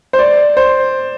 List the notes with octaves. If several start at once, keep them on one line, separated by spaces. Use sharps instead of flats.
C5
D5
C5